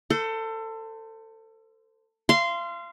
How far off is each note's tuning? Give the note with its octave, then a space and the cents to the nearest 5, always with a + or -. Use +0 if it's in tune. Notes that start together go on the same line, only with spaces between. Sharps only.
A4 +25 C5 -20
F5 -35 C6 -10